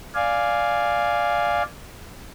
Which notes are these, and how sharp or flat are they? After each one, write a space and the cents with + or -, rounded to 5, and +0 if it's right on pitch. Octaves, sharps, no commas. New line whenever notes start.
D5 +0 F5 +0 G#5 +0